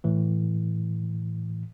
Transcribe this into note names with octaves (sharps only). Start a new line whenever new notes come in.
A2 E3